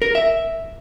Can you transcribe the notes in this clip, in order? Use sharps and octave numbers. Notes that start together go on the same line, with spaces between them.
A#4
E5